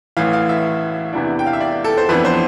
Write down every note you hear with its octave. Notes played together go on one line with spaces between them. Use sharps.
A1 A2 E3 F5
F5
E5
E2 C3 E3 B3 D4
G5
F5
E5
D5
A4
C5
F2 E3 B3 D4 B4
C5